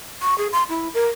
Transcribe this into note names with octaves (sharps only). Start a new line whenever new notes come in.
C#6
G#4
C6
E4
A#4